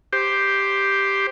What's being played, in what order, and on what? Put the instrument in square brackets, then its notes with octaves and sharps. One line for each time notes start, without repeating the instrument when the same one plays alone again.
[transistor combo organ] G4 C5